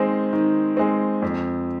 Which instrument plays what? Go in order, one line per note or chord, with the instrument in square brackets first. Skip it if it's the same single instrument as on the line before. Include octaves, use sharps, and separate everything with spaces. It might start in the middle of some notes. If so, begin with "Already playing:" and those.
Already playing: [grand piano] D#3 G#3 C4
D#3
G#3 C4
F2